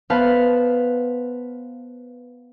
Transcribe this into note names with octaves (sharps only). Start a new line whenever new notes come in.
B3 B4 C5 F5 A5